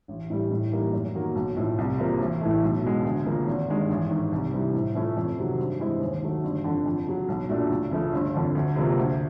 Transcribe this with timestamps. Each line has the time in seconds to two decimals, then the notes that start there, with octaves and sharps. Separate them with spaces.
0.08 A1
0.30 A2 E3 G3
0.51 A2
0.72 E3 G3 A#3 D#4
0.93 F#2
1.15 D#3 F#3 A#3
1.35 B1
1.56 A2 F3
1.78 C2
1.99 C3 F3 A#3
2.20 A1
2.41 A2 E3 A3
2.63 B1
2.83 B2 G#3
3.04 D2
3.25 C#3 F3 A#3
3.47 G#1
3.69 G2 D#3 G#3
3.90 A1
4.10 G#2 D#3
4.32 C2
4.53 C3 E3 G3
4.74 A2
4.95 F3 A3 C#4
5.17 F2
5.37 C3 D#3 F#3
5.59 G2
5.80 E3 G#3 C4 E4
6.01 D#2
6.22 D#3 F#3 A3
6.43 G1
6.64 F2 D3
6.86 F2
7.07 C#3 F#3
7.28 B1
7.49 A#2 F#3 A3 D4
7.70 C#2
7.91 C#3 F3 A3
8.13 G1
8.34 F2 D3
8.55 D2
8.76 C3 F3 A#3
8.97 D2